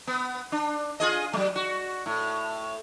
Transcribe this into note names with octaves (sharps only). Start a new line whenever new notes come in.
B3
D4
F4 G#4 D#5
F#3 G#3
F#4
A2